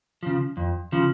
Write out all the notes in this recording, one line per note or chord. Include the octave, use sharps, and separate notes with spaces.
C#3 F3
F2
C#3 F3